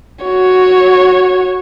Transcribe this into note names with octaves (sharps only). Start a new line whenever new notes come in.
F#4 C#5